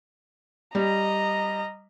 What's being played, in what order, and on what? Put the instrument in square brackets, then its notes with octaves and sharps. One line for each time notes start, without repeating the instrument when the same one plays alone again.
[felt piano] G3 [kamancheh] D#5 A#5